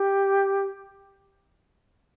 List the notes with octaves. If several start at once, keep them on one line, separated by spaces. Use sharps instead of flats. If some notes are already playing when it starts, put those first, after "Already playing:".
Already playing: G4